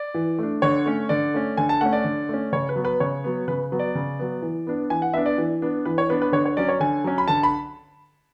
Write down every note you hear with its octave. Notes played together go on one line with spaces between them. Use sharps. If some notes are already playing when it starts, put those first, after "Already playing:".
Already playing: D5
E3
A3 D4
D3 C#5
A3 C#4
D3 D5
A3 C#4
D3 G#5
A5
A3 C#4 F#5
D5
D3
A3 C#4
C#3 C#5
B4
F#3 B3
B4
C#3 C#5
F#3 B3
C#3 B4
F#3 B3
D5
C#3
F#3 B3
E3
B3 D4
E3 G#5
F#5
B3 D4 E5
D5
E3
B3 D4
E3 B4
C#5
B3 D4 B4
B4
D3 C#5
C#5
F#3 C#4 D5
C#5
D3 G#5
F#3 C#4
B5
D3 A5
B5